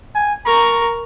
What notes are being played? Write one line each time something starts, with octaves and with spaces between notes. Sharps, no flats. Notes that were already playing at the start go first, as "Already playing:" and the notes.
G#5
A#4 A#5 C#6